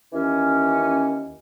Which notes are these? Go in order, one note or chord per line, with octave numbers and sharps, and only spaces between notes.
D#2 E3 C#4